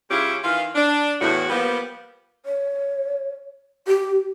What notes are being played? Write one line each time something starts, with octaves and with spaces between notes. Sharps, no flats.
C#3 G#3 C#4 E4 F4 G4
D#3 E3 F4 F5
D4
E2 A2 F#4
F3 G3 A#3 B3
C#5
G4